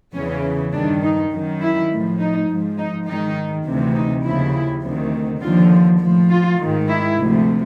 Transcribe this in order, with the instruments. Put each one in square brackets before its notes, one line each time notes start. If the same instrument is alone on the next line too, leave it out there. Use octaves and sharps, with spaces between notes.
[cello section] E2 C#3 E3 C#4
G2 D#3 D4
D#4
F#2 D#3
E4
A2 F3
D#4
G#2 F3
D#4
G#2 D#3 D#4
D2 C3 E3
D#4
D#2 C#3 F3 E4
D2 C3 D#3
D#2 D3 F3 F4
A2 F3
F4
G#2 D#3
E4
D2 C3 F3